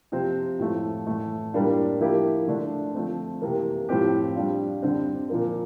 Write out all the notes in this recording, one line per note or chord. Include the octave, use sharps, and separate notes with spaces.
C3 F3 C4
A2 F3 A3
A2 E3 A3
A2 G3 A#3 D4 F4
F3 A#3 E4 G4
D3 A3 D4
F3 A3 C4
C3 E3 A#3
A2 F3 C4 G4
G3 D4 F4
D3 G3 C4
A#2 F3 A#3